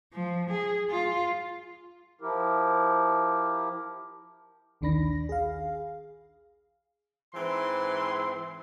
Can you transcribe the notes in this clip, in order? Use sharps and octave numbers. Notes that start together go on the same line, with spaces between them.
F3
G#4
F4
F3 E4 G4 A#4
A#1 D#2 D#3 D4 B5 A#6
G#4 F5
G#2 E3 C4 C6